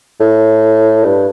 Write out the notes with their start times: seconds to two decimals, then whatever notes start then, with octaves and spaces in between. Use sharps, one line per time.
0.20 A2
1.04 G2